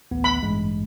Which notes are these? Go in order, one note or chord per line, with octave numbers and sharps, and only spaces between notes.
A1 D2 B3
B5
A1 G2 G#3